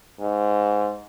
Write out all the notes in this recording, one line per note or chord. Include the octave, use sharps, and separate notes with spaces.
G#2